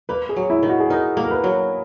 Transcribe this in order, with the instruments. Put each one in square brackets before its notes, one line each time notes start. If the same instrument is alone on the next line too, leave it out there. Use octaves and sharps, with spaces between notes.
[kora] A#3 [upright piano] B4
[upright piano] G#4
[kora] F#3
[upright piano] E4
[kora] D#3
[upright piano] F#4
G#4
[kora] D#4 [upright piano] A#4
[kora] A#3
[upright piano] A#4
B4
[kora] F#3